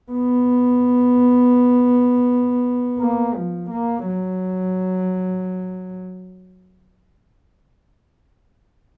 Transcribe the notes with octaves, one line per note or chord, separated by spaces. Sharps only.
B3
A#3
F3
A#3
F#3